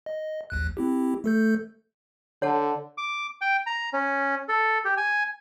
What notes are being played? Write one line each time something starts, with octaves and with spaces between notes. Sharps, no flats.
D#5
A#1 D#2 F#6
C4 E4 G4
A3 A4 G6
D3 C#5 F#5 A5
D6
G5
A#5
C#4
A4
G4
G#5